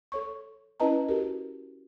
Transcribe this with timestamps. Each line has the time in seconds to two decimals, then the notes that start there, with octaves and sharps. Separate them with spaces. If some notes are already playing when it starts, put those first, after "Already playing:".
0.12 A4 C#5 C#6
0.80 C#4 E4 B4 D#5 A5 A#5
1.08 F#4 G4 A#4